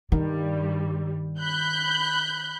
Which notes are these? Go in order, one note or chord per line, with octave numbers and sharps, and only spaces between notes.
G2 D#3 G3
B5 F#6 G6